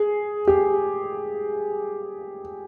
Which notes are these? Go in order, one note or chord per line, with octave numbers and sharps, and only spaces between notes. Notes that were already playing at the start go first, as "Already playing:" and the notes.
Already playing: G#4
G4